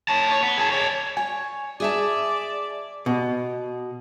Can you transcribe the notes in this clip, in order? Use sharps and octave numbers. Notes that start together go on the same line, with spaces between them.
C#5 A5
C#5
B3
G#4 A5
C#5 D5
C#5 G#5
G#4 D5 E5 A5
B2